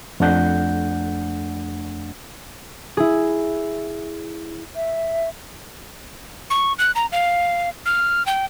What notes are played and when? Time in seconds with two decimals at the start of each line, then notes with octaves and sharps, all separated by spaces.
0.20 F2 A3 D4 F#5 G6
2.97 E4 G#4
4.76 E5
6.50 C#6
6.79 F#6
6.95 A#5
7.12 F5
7.86 F6
8.26 G5